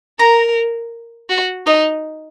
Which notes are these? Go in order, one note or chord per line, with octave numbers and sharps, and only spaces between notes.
A#4 A#5
F#4
D#4 D#5